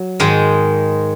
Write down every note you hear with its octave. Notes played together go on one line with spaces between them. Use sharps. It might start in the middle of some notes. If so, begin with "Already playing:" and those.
Already playing: F#3
G#2 D#3 G#3